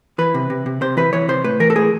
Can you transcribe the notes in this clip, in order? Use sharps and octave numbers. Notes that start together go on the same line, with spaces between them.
E3 B4
C3
C3
C3
C3 C5
E3 B4
E3 C#5
C3 C5
A2 B4
E3 A#4
A4
A2 G#4